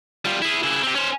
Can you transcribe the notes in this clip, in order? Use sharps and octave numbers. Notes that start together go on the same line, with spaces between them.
G3 F4
E4 G#4
C#3 E4
C4 G4
C#4 C5